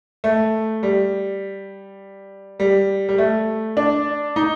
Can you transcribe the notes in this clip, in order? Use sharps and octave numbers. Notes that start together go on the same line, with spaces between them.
A3
G3
G3
G3
A3
D4
D#4